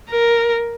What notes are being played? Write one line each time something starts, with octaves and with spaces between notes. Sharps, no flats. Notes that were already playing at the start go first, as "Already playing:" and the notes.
A#4